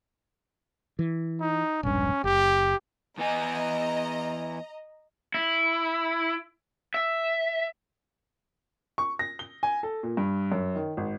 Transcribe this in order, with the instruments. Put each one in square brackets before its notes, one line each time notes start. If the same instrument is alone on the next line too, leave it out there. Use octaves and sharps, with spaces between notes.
[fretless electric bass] E3
[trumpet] D#4
[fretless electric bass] E1 A#1 G2 [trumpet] C#4
[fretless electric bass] F#1 [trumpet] G4
[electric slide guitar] E2 B3 G#5 [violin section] D#5 A#5
[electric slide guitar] E4
E5
[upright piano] C#6
A#6
G7
G#5
A4
A#2
G2
F#2
D#3
G#1